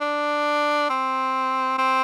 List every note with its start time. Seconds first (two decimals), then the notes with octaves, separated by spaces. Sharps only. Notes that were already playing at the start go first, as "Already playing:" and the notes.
0.01 D4
0.90 C4
1.78 C4